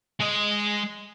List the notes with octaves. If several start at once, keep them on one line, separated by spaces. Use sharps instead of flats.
G#3 D#5